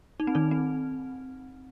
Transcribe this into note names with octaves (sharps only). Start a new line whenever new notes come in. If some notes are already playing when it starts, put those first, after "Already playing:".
D#4
C4
D#3 D#4
C4